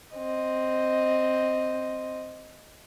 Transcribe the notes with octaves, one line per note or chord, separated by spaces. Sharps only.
C4 D#5